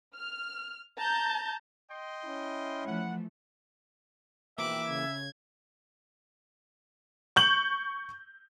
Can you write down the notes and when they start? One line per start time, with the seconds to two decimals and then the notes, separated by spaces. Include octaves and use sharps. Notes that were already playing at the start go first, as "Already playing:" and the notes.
0.15 F6
0.97 A5 A#5 G6
1.90 D#5 G5 C6
2.25 C#4 E4
2.85 E3 F3 A3 F#5
4.58 A#1 B2 E3 A#3 E5 G5 D6 F#6
4.88 C#3 G#6
7.36 C#6 G6 F#7